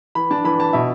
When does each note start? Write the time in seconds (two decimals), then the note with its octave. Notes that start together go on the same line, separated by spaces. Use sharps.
0.15 E3 B5
0.31 D4 A5
0.44 E3 B5
0.60 E3 A5
0.73 B2 E5